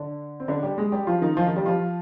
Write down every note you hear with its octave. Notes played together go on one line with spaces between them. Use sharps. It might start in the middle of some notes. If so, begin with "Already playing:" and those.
Already playing: D3 D4
C4
D3 D4
G3 G4
G#3 G#4
G3 G4
F3 F4
D#3 D#4
F3 F4
D#3 D#4
G3 G4
F3 F4